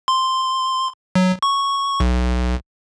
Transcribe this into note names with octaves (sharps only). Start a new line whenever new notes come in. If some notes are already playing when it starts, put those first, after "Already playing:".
C6
F#3
C#6
B1